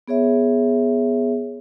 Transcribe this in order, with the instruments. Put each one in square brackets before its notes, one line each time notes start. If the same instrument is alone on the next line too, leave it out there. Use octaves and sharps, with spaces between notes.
[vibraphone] B3 G#4 C#5 E5